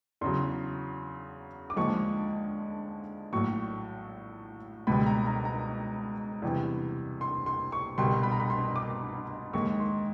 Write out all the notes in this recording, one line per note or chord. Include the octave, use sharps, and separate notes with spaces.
E2 C#3 F#3 C6
D6
D#2 D3 F3 G#3 C#6
A#1 A2 F#3 C#6
C#2 B2 G3 B5
A#5
A#5
A#5
E2 C3 E3 G3
C6
C6
C#6
C2 B2 G3 C6
B5
A#5
B5
C6
D6
D#2 D#3 G#3 C#6
C6